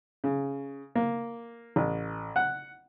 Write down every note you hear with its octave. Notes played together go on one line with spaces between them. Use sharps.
C#3
A#3
A1
F#5